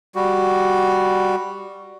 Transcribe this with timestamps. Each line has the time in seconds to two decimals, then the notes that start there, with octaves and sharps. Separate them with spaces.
0.15 G3 F#4